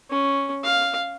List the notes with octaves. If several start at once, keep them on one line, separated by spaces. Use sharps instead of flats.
C#4
F5